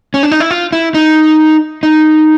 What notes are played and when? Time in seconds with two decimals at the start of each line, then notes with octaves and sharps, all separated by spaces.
0.14 C#4
0.23 D4
0.31 D#4
0.40 E4
0.51 F4
0.73 E4
0.94 D#4
1.83 D#4